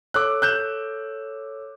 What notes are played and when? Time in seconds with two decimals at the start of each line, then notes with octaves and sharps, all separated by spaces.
0.14 A4 C#5 D6 E6 F#6
0.42 F#6 G6 E7